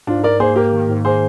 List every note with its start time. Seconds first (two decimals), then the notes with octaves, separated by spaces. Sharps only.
0.07 G#2 D4 F4
0.24 G#2 A#4 D5
0.40 A#3 G#4 C5
0.56 A#3 G4 A#4
0.72 D#3
0.89 G#2
1.05 A#3 G#4 C5